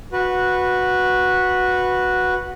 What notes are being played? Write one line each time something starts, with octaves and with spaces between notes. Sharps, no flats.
F#4 B4